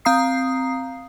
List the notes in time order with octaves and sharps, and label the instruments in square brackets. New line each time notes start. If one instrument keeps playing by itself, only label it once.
[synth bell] C4 F5 A#5 D#6 C7